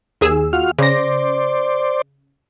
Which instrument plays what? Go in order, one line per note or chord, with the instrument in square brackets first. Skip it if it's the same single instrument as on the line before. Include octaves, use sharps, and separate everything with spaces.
[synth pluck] D#2 G#4 E6
[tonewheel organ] F4 F#4 F6
[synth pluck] C#3 A#6 [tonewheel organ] C5 D5